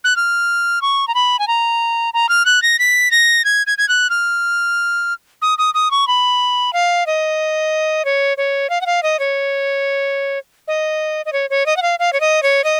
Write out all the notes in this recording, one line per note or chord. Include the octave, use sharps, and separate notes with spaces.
F#6
F6
C#6
A#5
B5
G#5
A#5
A#5
F6
F#6
A#6
B6
A#6
G#6
G#6
G#6
F#6
F6
D#6
D#6
D#6
C#6
B5
F5
D#5
C#5
C#5
F5
F#5
F5
D#5
C#5
D#5
D#5
C#5
C#5
D#5
F#5
F5
F5
C#5
D#5
C#5
D#5